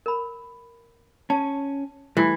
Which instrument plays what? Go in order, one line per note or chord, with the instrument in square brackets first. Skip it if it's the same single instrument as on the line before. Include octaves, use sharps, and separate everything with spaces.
[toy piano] A#4 B5
[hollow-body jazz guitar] C#4 [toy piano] A5
[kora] E3 [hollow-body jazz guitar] G3 A3